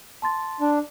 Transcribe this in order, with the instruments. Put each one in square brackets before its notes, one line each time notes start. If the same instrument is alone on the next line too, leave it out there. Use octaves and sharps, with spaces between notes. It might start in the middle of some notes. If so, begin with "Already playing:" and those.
[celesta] A5 C6 A6
[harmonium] D4